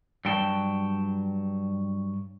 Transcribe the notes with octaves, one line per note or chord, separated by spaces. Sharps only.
G2 F#3 G5 A5